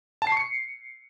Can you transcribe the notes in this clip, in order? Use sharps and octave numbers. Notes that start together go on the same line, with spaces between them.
A5
C7
C#6
C#7